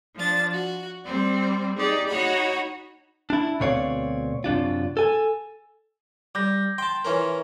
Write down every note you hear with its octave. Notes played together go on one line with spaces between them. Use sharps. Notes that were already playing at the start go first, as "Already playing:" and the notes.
F3 D4 A6
F#4
G3 C4 D5
D#4 G4 G#4 D5
D#4 F#4 C#5 F#5 B5
D4 E4
D2 B2 C4 C#5 D5 F5
F#2 C3 D4 F4
A4 G#5
G3 D6 G6 A#6
G5 A5 C6
E3 C#4 A#4